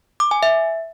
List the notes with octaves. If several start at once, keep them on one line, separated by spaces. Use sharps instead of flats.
D6
G#5
E5